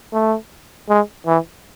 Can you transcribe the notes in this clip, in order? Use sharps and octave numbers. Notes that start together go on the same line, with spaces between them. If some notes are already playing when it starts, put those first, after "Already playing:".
A3
G#3
E3